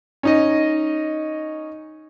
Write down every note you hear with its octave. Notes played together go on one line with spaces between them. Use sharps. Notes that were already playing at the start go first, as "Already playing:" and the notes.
C#4 D#4 D#5